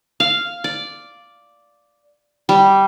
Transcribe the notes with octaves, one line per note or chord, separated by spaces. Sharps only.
F5
D5
G3